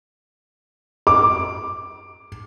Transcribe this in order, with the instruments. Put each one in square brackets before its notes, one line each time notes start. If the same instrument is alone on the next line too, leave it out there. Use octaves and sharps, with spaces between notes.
[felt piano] D6